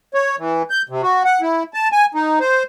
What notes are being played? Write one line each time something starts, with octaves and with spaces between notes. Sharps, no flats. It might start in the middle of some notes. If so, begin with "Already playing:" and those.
C#5
E3
G6
C3
F#4
F#5
E4
A5
G#5
D#4
C5